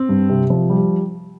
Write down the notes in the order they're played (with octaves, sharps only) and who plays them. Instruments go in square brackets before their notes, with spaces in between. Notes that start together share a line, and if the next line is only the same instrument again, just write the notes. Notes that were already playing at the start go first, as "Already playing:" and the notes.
Already playing: [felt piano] C4
[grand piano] G2
C3
F3
G3